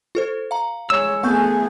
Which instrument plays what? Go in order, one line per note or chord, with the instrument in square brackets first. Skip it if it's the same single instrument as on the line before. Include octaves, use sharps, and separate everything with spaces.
[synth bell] F4 A4 C5
F5 A#5
[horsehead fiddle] G#3 C#5 [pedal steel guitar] E6
[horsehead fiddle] A3 G#4 [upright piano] B3 [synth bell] G#5 C#6 G6